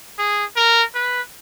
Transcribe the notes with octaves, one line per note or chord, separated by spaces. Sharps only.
G#4
A#4
B4